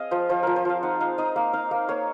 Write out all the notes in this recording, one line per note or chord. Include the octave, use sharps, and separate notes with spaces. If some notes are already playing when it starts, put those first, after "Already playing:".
Already playing: C4 G#4 D#5 F5
F3 C5
F3 C5
F3 A#4
C5
F3 F5
D#4 F#5
D#4 F5
D#4 D#5
A#3 F5
D#4 F5
A#3 F5
A#3 C#5